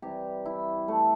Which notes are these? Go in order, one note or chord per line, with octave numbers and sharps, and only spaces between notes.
C3 E3 G3 G4
E4
A3